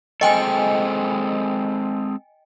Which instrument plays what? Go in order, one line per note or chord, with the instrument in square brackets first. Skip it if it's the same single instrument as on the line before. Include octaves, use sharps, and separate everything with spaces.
[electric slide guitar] G#3 C4 A4 [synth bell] D#5 G5 G#5